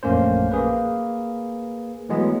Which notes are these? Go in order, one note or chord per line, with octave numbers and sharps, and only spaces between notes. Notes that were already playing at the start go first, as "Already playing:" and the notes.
A#1 F#2 A3 A#3 C#4 C5
A#3 G#4 B4
E3 F#3 G#3 A3 B3